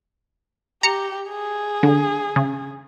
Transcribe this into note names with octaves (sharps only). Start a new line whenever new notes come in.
G4 A#5 C#7
G#4
D3
C#3